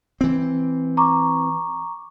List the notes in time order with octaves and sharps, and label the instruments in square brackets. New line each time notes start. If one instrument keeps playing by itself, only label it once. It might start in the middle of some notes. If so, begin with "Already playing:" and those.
[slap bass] E3 C4
[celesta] A#5 C#6 D6